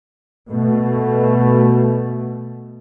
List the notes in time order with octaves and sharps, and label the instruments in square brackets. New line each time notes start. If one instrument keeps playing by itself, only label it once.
[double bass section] B2 A3